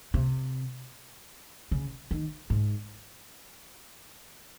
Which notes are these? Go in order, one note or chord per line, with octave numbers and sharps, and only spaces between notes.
C3
C#3
D#3
G#2